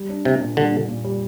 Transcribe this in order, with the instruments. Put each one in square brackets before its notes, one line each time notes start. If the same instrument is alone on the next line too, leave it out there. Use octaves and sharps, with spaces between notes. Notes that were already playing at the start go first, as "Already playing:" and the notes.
Already playing: [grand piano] G3
D4
[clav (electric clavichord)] C3 [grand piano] D4
[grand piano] A#2
[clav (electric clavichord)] D3 [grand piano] G3
[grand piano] A#2
A#2
G3